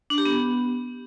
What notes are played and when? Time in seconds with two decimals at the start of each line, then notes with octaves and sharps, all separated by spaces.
0.10 D4
0.18 G4
0.25 B3